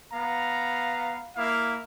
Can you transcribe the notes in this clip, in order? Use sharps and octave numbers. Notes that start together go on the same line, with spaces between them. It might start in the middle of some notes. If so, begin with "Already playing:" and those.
B3 F5 A#5
A#3 E4 F5